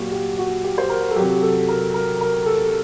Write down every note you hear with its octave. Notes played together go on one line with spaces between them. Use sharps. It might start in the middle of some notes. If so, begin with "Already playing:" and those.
Already playing: A#2 F#3 F#4 G4
G4
F#4
G4
C5
A#4
A4
C3 F#3 G4
A4
A#4
A#4
A#4
A4